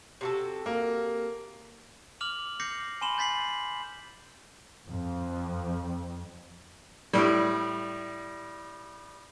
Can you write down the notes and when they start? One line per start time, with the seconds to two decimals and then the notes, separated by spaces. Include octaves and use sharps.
0.21 C3 F#4 A4
0.66 A#3
2.21 D6 F6 F7 F#7
2.60 D6 G6 A#6 C7 C#7
3.01 G#5 B5 C6 E7 F#7
3.18 G6 A6 B6 C7 F#7
4.87 F2
7.13 A2 G3